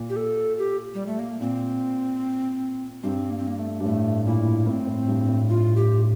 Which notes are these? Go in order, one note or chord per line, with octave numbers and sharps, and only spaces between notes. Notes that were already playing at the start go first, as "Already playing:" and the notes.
Already playing: A#2
G4
A4
G4
G3
A3
A#3
A#2 C4
G2 C4
A#3
C4
A#3
A3
G2
A2 A3
A#2 E4
A2 C4
A2
G2
A2
F4
G4